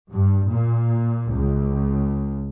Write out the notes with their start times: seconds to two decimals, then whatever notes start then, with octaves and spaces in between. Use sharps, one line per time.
0.11 G2
0.49 A#2
1.30 C#2